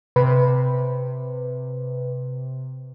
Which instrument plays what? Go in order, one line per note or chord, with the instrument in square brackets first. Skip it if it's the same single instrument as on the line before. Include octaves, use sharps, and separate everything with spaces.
[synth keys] C3 [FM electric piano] B4